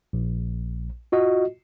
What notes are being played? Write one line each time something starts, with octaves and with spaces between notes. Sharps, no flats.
A#1
F4 F#4 D#5